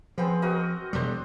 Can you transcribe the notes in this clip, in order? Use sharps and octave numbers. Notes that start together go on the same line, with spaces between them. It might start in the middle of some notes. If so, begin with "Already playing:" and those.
F3 G#3 B3 C4
F#4 A#4 D#5
E1 G3 D4 C5